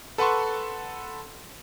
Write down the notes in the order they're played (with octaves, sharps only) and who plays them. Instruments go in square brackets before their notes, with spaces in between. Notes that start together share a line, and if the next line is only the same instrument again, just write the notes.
[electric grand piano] A4 B4 F#5 A5 C6 C#6